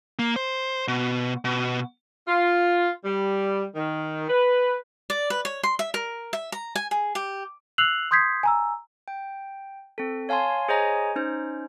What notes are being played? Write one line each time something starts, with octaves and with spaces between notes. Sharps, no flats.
A#3
C5
B2
B2
F4
G3
D#3
B4
D5
B4
C#5
C6
E5
A#4
E5
A#5
G#5
G#4
G4
E6 F#6 C7 F7 F#7
C6 D#6 G6 G#6 B6 C7
G#5 A#5 E6
G5
C4 A4
C#5 F5 G#5 A5 C6
G#4 C5 C#5 D#5 G#5 A#5
C#4 D#4 C5